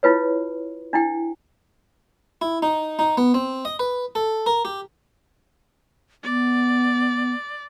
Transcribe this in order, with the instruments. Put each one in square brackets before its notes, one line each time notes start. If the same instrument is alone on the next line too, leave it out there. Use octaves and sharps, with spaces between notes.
[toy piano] E4 F4 B4 C#5
D4 E4 G5
[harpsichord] E4
D#4
D#4
B3
C4
D#5
B4
A4
A#4
G4
[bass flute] B3 [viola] D5